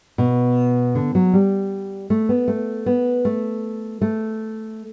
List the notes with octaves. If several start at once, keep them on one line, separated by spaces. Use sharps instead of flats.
B2
D3
F#3
G3
A3
B3
A3
B3
A3
A3